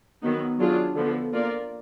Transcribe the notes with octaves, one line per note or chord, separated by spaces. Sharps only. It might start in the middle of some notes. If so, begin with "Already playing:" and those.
D#3 F#3 B3 D#4
F#3 D4 F4 G#4
D3 F3 B3
A#3 F4 A#4 D5